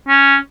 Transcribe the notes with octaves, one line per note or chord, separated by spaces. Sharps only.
C#4